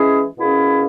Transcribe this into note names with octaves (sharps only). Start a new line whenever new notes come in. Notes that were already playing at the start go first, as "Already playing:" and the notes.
Already playing: E3 G#3 C#4 E4 G#4
B2 A#3 C#4 E4 G#4